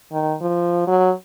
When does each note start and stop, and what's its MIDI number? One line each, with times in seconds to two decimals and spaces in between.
0.12 0.34 51
0.42 0.85 53
0.87 1.11 54